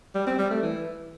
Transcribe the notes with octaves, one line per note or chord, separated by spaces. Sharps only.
G3
C4
G3
A3
E3